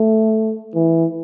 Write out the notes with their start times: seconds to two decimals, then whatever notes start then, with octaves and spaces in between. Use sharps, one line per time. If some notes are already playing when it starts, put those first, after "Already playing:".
Already playing: A3
0.75 E3